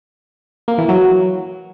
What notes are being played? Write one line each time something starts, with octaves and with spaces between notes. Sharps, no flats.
A#3
E3
F#3